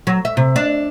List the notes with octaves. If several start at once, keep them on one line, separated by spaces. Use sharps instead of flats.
F#3
E5
C3
D4